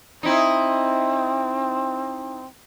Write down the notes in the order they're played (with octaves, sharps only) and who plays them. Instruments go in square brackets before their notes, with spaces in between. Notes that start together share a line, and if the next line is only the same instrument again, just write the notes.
[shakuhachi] C4 [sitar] D#4 E4